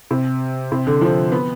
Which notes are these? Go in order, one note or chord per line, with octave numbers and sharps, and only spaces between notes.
C3
C3
D3
F3
B3